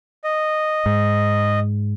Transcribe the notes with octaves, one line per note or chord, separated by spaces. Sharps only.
D#5
G#2